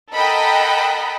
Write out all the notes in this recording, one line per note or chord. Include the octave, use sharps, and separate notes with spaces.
A4 A#4 D#5 F#5 G5 B5